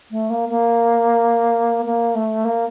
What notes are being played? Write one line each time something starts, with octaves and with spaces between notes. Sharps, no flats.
A3
A#3
A#3
A#3
A3
A#3